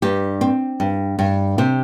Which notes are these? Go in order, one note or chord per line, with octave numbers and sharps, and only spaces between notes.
G2 G4
C4
G2
G2
C3 G4 C5